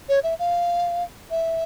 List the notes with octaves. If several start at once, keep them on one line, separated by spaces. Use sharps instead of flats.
C#5
E5
F5
E5